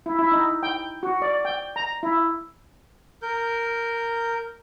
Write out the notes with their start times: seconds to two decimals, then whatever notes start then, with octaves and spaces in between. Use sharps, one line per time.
0.06 E4
0.19 E4
0.32 D#4
0.63 G5
1.03 F#4
1.22 D5
1.45 G5
1.76 A#5
2.03 E4
3.22 A#4 G6